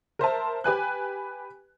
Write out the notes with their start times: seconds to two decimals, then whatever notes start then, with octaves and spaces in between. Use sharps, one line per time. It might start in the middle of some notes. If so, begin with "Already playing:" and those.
0.19 A#4 C5 E5 A5
0.64 G4 B4 G#5 F#6